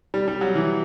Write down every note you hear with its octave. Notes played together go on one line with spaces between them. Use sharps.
G3
G3
F#3
E3